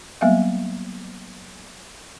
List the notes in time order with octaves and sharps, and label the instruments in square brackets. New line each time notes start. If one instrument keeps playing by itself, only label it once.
[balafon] F#3 G3 A#3 B3 E5 F5